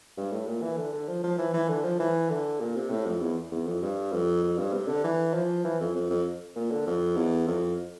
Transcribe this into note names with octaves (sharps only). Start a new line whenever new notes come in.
G2
A2
A#2
E3
D3
D3
F3
F3
E3
E3
D3
F3
E3
D3
A#2
C3
A2
F2
E2
E2
F2
G2
F2
F2
G2
C3
D3
E3
F3
E3
F2
F2
F2
A#2
D3
F2
E2
F2